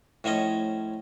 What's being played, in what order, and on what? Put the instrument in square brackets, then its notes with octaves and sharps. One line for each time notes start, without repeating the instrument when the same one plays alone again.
[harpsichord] A2 F3 C#4 D#5